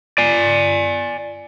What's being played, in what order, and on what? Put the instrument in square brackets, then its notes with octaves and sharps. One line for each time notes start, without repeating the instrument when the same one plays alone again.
[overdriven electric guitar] D5 G#5